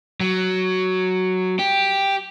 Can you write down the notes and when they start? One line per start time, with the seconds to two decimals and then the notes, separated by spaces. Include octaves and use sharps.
0.20 F#3
1.59 G4